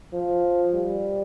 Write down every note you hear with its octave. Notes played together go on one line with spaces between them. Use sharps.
F3
G3